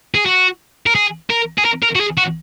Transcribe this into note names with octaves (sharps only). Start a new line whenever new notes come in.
G#4
F#4
A#4
G#4
A#4
G#4
A#4
A#4
F#4
G#4
F#4